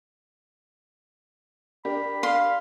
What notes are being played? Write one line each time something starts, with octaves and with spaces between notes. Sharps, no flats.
D4 G4 A#4 B5
F5 C6